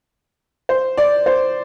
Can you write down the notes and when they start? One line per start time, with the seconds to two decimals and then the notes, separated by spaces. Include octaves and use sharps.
0.69 C5
0.97 D5
1.26 C5